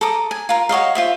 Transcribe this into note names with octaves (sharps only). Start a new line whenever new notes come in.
A4 A#5 D6 D#6
G#5
F4 A#4
F#4 C#5 D#5 F5
F4 C5 E5